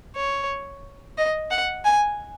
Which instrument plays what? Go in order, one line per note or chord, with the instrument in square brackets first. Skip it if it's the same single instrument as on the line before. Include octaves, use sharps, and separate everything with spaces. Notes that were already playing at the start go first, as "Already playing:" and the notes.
[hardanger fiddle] C#5
D#5
F#5
G#5